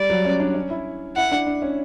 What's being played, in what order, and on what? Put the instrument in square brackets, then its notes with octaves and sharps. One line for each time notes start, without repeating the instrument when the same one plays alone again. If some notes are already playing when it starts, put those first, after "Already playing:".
Already playing: [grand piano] G3 [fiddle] D5
[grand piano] F#3
C#4
D4
C#4
E4
[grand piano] E4 [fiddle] F#5
[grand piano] D4
D4
C#4